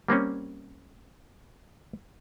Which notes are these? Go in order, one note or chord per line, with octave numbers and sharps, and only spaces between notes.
G3 A#3 C4 C#4